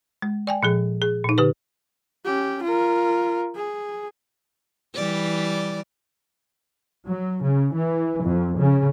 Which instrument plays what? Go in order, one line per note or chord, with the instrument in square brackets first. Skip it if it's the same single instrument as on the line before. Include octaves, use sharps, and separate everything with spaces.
[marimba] G#3
D5 G5 G#5
A#2 F3 G#4
G#4
A#2 D#4
D3 G4 B4
[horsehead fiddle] C#4 G4
F4 A#4
G#4
[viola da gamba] E3 G3 D5
[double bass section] F#3
C#3
E3
F2
C#3